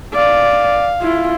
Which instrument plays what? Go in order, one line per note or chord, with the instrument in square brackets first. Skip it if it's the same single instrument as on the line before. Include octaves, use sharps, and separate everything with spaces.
[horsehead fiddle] D5 [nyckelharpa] F5
[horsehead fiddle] E4 F4